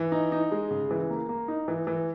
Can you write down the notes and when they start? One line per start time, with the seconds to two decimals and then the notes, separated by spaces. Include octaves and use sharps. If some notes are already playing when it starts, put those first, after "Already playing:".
Already playing: E3
0.12 D#4
0.32 D#4
0.52 G#3
0.71 C#3
0.91 E3
1.10 A#3
1.29 A#3
1.48 D#4
1.68 E3
1.87 E3